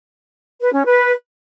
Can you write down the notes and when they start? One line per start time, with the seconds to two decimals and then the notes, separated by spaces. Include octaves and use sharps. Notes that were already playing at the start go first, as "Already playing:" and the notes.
0.61 B4
0.73 C#4
0.84 B4